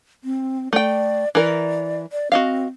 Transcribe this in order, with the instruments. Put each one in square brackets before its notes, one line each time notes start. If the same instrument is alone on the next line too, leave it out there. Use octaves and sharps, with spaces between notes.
[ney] C4
[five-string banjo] A3 G5 [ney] D5
[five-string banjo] E3 A#4 [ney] D5
[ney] D5
[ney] C4 [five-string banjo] F#4 D#5 F5